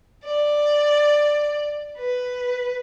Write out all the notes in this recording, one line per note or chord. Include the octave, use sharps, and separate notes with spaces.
D5
B4